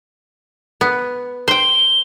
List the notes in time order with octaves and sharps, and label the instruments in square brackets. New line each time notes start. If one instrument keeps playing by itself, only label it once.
[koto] B3
[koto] C5 G5 [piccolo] G7